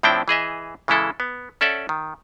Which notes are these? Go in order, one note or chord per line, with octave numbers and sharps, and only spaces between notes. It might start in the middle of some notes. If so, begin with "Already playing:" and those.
A2 F3 C4 D4 E4 G5
E3 G#4 D#5 E5
C#3 E3 G#3 E4 A4
B3
C#4 A4 D5 E5 F#5
D#3